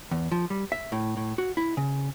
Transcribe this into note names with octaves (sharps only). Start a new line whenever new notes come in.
E2
F3
G3
E5
A2
A2
F#4
E4
C#3